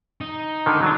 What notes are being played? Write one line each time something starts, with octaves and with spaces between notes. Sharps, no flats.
D#4
D3 D#3
F#3 D4